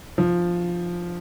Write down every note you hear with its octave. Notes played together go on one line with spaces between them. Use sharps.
F3